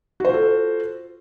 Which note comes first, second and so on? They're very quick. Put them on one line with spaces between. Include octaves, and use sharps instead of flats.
F#4 C5 F4 A4